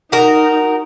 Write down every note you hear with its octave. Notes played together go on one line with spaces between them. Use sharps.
D#4 F#4 A#4